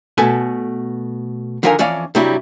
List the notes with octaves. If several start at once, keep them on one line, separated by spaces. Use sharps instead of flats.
B2 A3 A4 B4 G#5
D3 D#3 F3 A#4 F5 G#5
F2 E3 C#4 D5 F5
G2 C3 F#3 G3 E4